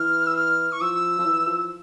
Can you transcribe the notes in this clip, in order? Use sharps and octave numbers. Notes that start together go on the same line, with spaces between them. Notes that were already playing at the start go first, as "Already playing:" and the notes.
Already playing: E3 F6
E6
F6
C#6
F3 E6
F3
E3
F3